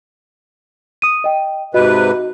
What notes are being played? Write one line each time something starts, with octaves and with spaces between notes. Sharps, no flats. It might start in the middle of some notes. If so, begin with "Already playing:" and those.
D#6 D#7
D#5 G5
G#2 C3 F#4 B4 D#5